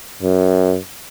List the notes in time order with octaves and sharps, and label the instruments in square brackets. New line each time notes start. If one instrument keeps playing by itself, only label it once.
[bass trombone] F#2